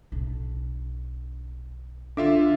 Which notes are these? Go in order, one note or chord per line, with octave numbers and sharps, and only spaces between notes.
B1 D4
D3 F4 E5 D6